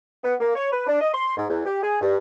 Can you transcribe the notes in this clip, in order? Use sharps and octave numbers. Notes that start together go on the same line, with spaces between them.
B3
A#3
C#5
B4
D4
D#5
C6
G#2
E2
G4
G#4
G2